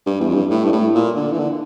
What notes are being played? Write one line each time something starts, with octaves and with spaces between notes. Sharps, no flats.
G2
E2
F2
G2
A2
G2
A2
A#2
D3
E3
D3